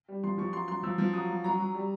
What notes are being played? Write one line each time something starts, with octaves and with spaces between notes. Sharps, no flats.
G3
F3 C6
F3 C#6
F#3 C6
F#3 C6
F3 E6
F3
F#3 D#6
F#3
F#3 A#5
F#3
G3